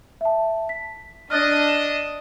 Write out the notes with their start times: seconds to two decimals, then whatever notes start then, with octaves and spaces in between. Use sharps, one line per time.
0.21 E5 A5
0.69 B6
1.30 D4 D#5 F6 F#6 A6
1.68 E7